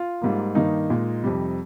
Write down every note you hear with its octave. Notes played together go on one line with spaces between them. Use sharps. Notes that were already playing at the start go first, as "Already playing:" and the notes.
Already playing: F4
G#2 G3 A#3
G2 D#3 A#3 D#4
A#2 G#3
F2 C3 G3